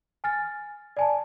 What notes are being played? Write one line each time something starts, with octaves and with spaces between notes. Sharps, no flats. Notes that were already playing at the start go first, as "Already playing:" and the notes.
G#5 F6 A6
D5 G#5 A5